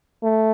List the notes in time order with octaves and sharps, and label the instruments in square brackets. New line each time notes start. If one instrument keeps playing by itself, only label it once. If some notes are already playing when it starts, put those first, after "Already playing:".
[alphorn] A3